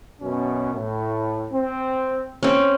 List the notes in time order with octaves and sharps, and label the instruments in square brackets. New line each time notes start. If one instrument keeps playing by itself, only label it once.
[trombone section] F#2 B2 C#4
A2
C4
[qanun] C4 C#4